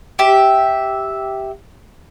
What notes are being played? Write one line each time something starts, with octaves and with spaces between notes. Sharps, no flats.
G4 E5